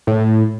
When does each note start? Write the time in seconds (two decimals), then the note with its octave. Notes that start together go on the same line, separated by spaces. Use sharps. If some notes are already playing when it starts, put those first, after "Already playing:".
0.07 A2